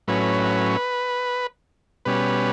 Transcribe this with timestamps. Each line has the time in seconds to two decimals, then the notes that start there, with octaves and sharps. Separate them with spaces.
0.08 A2 F#3 C#4 B4
2.05 B2 G3 C#4 B4